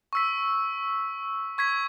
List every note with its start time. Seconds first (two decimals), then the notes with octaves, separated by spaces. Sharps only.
0.13 C#6 E6 B6
1.58 C#6 G#6 B6